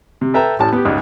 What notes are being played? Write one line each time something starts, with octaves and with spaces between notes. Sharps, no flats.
C3
A4 B4 E5 G5 A#5
A1 A2 A5
B3 G4
C#2 G#2